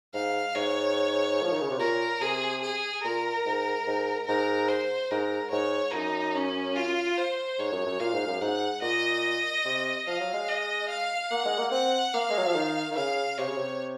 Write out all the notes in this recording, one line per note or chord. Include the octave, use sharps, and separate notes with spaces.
G#2 F5
G#2 C#5
F3
D#3
C#3
C3
A#2 A#4
C3 G#4
G#4
A#2 A#4
G#2
G#2
G#2 A#4
C5
G#2 A#4
G#2 C#5
F#2 D#4
C#4
F4
C5
G#2 C#5
F#2
F#2
A#2 F5
G#2
F#2
G#2 F#5
A#2 D#5
C3
F3 F5
F#3
G#3
D#5
F5
A#3 F#5
G#3
A#3
C4 F#5
A#3 F5
G#3
F#3
F3
D#3
D#3
C#3 F5
C3 C#5
C#3
C3